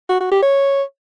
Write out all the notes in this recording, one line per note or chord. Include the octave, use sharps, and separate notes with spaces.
F#4
F#4
G4
C#5